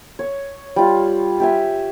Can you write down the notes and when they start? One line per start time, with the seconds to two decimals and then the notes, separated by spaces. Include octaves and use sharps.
0.19 C#5
0.76 G3 F4
1.40 G4 E5 G#5